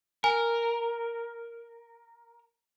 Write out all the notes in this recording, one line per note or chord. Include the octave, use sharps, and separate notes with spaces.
A#4 G#5